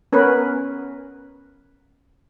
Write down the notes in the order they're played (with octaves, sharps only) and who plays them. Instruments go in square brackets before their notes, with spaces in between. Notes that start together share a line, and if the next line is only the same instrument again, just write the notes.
[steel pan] B3 C#4 A#4 B4